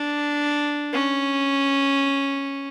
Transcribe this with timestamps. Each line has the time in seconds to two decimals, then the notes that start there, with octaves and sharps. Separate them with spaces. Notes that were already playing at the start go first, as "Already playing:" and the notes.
Already playing: D4
0.93 C#4